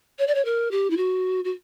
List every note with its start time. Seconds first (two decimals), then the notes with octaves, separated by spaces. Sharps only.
0.19 C#5
0.27 D5
0.35 C#5
0.45 A#4
0.71 G4
0.90 E4
0.97 F#4
1.44 F#4